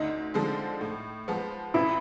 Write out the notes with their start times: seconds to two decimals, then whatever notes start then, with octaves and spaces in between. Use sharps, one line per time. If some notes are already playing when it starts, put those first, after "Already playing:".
Already playing: D2 D#4
0.34 D3 F3 G#3 C4
0.81 A2
1.28 F3 G#3 B3
1.74 A1 E4